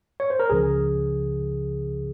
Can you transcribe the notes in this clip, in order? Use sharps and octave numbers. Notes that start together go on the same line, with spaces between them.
C#5
C5
A#4
C#2 C#3 F3 G#4